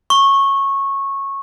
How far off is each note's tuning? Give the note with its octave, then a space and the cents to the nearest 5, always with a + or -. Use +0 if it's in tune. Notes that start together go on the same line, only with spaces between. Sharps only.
C#6 -15